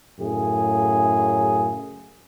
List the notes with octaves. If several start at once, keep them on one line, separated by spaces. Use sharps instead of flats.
F#2 A2 C#3 G#4